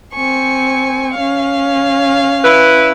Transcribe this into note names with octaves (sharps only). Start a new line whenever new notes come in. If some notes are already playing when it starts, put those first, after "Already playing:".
C4 G#5 C#6
C#4 F5
E4 B4